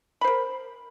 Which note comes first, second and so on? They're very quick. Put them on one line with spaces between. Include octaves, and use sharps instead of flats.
B5 C5 A#4